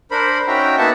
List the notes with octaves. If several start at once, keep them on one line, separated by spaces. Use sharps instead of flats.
D4 A#4 C5 B5
C#4 D#4 F#4 E5 G5 A#5
A#3 B3 D#4 E5 F#5 A5